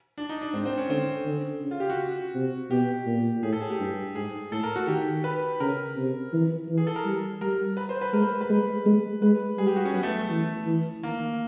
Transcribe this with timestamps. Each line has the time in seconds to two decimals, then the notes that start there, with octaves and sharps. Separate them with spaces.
0.18 D4
0.29 D#4
0.41 D4
0.54 G#2 C4
0.66 C4
0.78 C#4
0.89 D3 C4
1.26 D3
1.62 C#3
1.71 F4
1.80 G4
1.90 F#4
2.35 C3
2.70 B2 G4
3.06 A#2
3.43 A2 G#4
3.53 A4
3.61 G#4
3.70 G4
3.79 G2
4.15 G#2 G#4
4.52 A2 A4
4.63 A#4
4.76 F#4
4.87 D#3 G4
5.24 B4
5.60 C#3 A#4
5.97 C3
6.33 E3
6.69 E3
6.78 G#4
6.87 A4
6.96 A#4
7.05 G3
7.41 G3 A#4
7.77 B4
7.89 C5
8.01 B4
8.13 G#3 A#4
8.22 B4
8.41 B4
8.50 G#3
8.86 G#3
9.22 G#3 B4
9.58 G3 G#4
9.67 G4
9.76 F#4
9.85 C#4
9.94 F#3 B3
10.03 A3
10.22 A3
10.30 E3
10.67 E3
11.03 D#3 A#3